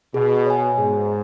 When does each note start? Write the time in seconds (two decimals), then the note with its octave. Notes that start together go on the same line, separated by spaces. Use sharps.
0.14 B2 G#4
0.47 C#5 G#5
0.78 G#2 G#4